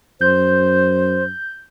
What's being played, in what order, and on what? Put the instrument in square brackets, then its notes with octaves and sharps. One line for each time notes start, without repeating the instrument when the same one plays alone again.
[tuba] F#2 [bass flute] C5 [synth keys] G6